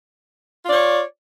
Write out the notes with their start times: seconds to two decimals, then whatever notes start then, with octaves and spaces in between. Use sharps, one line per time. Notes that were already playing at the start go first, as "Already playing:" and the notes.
0.65 F4
0.68 D5
0.71 C#5